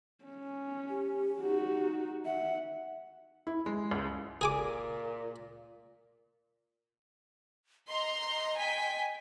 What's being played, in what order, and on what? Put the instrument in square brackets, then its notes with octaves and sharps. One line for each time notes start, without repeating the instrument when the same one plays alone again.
[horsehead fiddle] C#4
[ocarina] G4
[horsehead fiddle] D#4 F#4
[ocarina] E5 [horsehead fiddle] F#5
[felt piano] E4
G#3
C#2
[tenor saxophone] A#2 [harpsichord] G#4 G#5 D6
[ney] D#5 [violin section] A#5 C6
[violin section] G5 G#5 B6